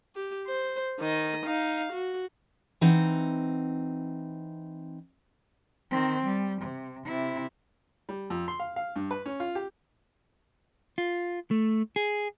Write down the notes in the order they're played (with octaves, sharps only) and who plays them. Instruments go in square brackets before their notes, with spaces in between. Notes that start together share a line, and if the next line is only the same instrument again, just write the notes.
[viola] G4
C5
D#3 D#5
D#4 F5
F#4
[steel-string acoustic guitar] E3 C4 D#4 F#5
[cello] D#3 C4
G3
C3
C3 E4
[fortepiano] G3
F2
C6
F5
F5
G2
B4
C#4
F4
G4
[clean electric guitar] F4
A3
G#4